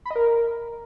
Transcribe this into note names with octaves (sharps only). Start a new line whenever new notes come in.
B5
D#5
A#4